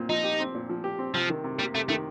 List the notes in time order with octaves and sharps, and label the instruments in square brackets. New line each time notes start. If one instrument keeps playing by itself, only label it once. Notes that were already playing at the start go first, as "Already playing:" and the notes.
Already playing: [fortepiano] A#2 C4
[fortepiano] F3 [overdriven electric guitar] D#4
[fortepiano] G4
C4
A#2
F3
G4
C4
[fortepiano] C3 [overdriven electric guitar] F3
[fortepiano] D#3
C3
[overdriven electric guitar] G3 [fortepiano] A#3
[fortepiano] C3 [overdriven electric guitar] A3
[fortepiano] D#3 [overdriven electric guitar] A3